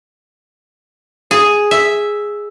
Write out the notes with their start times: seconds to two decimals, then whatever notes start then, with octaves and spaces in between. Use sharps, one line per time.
1.31 G#4
1.71 E5